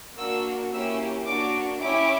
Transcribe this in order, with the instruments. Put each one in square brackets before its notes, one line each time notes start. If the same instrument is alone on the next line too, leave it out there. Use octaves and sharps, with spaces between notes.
[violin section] A#3 D4 F#4 E6
A#3 C#4 E4 G4 E6
A#3 D4 F#4 D6
C#4 E4 G4 D6